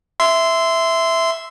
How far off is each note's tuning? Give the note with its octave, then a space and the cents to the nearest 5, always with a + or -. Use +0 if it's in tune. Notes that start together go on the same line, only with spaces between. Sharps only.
E5 +0 C6 -15